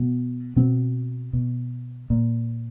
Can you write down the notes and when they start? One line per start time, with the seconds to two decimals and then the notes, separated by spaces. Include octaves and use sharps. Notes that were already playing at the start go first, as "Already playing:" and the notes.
Already playing: B2
0.56 B2 C4
1.33 B2
2.10 A#2